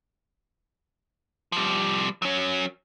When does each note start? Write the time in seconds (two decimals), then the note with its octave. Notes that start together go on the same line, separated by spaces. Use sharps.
1.52 F3 G3
2.22 F#3 C#4